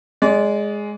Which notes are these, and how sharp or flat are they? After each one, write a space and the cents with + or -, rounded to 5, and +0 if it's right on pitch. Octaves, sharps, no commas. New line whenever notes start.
G#3 +0 D5 -30